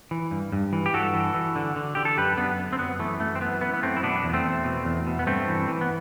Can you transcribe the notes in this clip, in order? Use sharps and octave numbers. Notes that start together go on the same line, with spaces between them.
E3
G2
G2
E3
G4
G2 F#4 A4
E3
E3
D3
D3
D3 G4
A4
F#2 G4 B4
F#2 B3 D4
D3
C4
F#2 B3
E3 A3
F#2 A3
C4
E3 B3
E3 B3
B3
F#2 A3 C4
E4
B2 B3 D4
E2
B3
A3 C4
E2
B2
E2
B2
B3
G2 A3 C4
E3
E3
B3